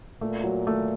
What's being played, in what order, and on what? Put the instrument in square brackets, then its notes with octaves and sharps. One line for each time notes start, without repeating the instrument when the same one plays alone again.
[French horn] A#2 [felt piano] A3
[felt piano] F#3
A3